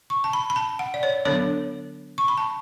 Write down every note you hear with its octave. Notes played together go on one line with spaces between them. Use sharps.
C#6
A5
B5
B5
A5
F#5
D5
C#5
D3 F#3 B3 D4 C#5
C#6
B5
A5